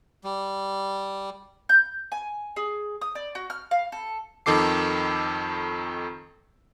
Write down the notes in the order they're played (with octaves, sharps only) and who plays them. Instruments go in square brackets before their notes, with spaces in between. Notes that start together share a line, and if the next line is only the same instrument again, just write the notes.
[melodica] G3
[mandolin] G6
G#5
G#4
D#6
D5
F#4
F6
F5
A4
[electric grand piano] F2 D#3 A4 D6 C7